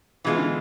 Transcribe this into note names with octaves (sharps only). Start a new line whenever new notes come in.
B2 E3 G#3 D4 F4
D3